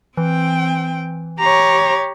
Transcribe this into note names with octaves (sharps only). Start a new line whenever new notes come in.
E3 C4 G5
G4 C#5 A#5